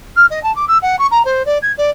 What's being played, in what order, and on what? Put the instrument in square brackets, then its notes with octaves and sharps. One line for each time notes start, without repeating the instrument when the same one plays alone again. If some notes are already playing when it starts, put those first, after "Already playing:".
[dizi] F6
D#5
A5
D6
E6
F#5
C#6
A#5
C5
D5
G#6
D5